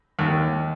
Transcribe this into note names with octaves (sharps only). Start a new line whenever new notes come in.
D#2